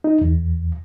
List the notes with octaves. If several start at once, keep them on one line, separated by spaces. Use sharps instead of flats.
D#4
E2